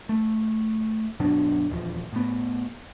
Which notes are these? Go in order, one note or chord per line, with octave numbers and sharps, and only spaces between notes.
A3
G1 B2 F#3 D4
D#1 E2 F3
A2 B3